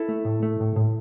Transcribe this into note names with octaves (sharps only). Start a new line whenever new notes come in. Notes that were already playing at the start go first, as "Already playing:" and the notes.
Already playing: E4 A4
A3
A2
A3
A2
A2